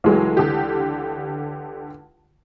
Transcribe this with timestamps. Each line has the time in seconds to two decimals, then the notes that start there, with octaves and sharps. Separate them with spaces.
0.04 C#2 E3 F#3 G#3 A3
0.37 D3 G4